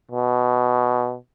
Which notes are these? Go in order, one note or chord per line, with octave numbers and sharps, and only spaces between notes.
B2